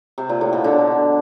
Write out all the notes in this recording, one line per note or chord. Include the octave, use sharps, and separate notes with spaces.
C3
A#2
A2
B2
D3